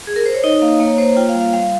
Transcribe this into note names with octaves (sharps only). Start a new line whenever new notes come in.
G#4
A#4
C5
C#5
D#4 D#5
A#3 F5
A#3 C#5
A#3 C5
F4 G5
F5
G3
F5
G3 F5